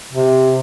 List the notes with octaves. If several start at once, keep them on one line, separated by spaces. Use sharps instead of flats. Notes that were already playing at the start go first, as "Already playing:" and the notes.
C3